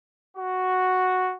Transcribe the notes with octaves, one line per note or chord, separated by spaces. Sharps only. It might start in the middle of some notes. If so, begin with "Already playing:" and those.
F#4